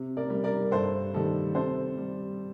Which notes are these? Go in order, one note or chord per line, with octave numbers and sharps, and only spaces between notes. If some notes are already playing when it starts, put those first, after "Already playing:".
Already playing: C3
A#4 D5
G3
A#4 D5
G2 A4 C5
D#3 G3 A4
C3 A4 C5
G3